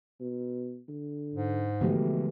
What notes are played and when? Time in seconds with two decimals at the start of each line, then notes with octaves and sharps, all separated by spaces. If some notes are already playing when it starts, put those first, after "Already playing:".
0.20 B2
0.89 D3
1.34 G#2
1.81 B2 D3 E3 F3 G#3 A3 G4